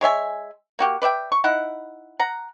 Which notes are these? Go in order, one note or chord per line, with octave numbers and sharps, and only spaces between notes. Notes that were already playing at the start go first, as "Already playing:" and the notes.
G#3 C#5 E5 G#5
A#3 F#4 G4
B4 D5 E5 G5
C#6
D#4 E4 F#5
F#5 A#5